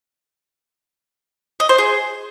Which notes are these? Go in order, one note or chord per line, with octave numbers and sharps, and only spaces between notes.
D#5
C5
G#4